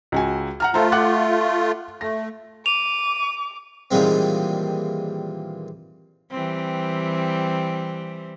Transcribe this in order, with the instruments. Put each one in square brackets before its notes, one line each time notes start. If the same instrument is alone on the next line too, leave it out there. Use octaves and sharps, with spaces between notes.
[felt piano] C#2 F#4 G#5
F#5 A#5 F6
[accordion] A3 F4 [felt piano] A4 C5 A#5
[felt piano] F#5 D6 F#6
[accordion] A3 [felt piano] A#6
[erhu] D6 [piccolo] D#7 [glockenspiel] F7
[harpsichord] A#2 D#3 E3 G3 G#3 C4
[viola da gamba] E3 G3 C4